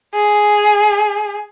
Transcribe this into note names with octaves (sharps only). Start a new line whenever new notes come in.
G#4